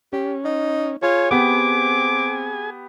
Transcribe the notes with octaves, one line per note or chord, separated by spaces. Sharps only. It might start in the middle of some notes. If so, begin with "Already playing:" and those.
C#4 G4
D#4
F4 G#4 C#5 G#5
B3 C4 G4 D6